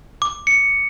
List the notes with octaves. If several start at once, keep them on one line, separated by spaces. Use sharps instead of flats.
D6
C#7